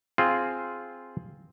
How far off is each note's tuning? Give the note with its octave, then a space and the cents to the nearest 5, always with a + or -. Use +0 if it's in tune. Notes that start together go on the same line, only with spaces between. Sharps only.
C4 +0 F4 -5 G#4 +5